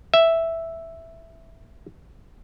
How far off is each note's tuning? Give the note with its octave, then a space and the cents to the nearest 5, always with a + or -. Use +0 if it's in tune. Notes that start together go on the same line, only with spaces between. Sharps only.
E5 +0